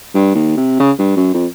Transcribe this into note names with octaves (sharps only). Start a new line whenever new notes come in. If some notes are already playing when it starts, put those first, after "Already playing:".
G2
D#2
C3
C#3
G2
F#2
F2